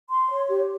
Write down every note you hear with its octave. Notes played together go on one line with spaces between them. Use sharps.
C6
C#5
G4